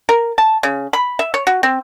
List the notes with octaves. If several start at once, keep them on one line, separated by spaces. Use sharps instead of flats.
A#4
A5
C#3
B5
E5
C#5
F#4
C4